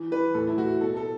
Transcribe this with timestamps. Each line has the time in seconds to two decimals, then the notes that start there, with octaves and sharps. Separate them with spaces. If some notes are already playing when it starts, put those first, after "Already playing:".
Already playing: E3
0.11 E3 B4
0.34 A2 A4
0.47 E4
0.58 A2 F#4
0.81 B2 A4
0.97 A4